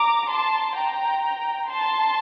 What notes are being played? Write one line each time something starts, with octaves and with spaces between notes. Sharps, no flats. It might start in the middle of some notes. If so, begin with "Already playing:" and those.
Already playing: A#5 D6
A5 C6
G5 A#5
A5 C6